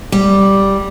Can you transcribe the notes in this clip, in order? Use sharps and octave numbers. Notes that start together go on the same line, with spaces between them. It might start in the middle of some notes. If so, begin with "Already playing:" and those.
G3